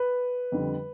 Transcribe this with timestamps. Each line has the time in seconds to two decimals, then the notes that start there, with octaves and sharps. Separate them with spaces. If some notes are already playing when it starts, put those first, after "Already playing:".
Already playing: B4
0.52 F2 D3 G3